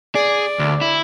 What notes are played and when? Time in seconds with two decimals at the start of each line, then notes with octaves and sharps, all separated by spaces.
0.15 G#4 D5
0.59 D2
0.81 E4